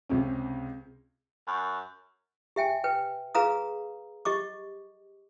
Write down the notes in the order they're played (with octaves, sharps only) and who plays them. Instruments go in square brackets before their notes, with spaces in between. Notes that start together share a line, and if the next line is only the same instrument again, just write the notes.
[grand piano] C#2 C3 C#4
[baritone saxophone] F#2
[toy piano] G4 E5 G5 G#5
B4 G5
G#4 B4 F5 A#5 D#6
G4 D#5 C#6 D6